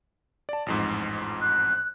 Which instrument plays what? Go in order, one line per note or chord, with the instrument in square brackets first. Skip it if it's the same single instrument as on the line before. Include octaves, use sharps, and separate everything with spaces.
[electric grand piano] D5 A5
A1 F2 G#2
[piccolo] F#6